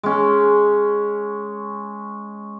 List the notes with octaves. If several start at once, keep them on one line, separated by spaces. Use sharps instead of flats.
G#3 C#4